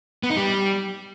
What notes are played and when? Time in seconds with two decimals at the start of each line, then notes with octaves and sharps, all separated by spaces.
0.23 B3
0.30 D#4
0.36 G3